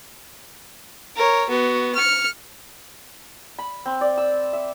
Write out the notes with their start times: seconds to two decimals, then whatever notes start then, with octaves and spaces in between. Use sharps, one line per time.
1.16 A#4 C#5
1.50 B3 F#4
1.95 F6 C#7
3.58 B5
3.86 C4
4.01 D5
4.17 E6
4.53 E5